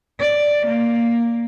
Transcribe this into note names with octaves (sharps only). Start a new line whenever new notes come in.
D5
A#3